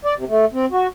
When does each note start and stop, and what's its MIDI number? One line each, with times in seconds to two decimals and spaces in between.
0.05 0.14 74
0.17 0.25 48
0.29 0.45 57
0.53 0.65 60
0.72 0.87 66